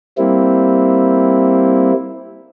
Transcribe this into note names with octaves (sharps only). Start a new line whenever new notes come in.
G3 A#3 C4 E4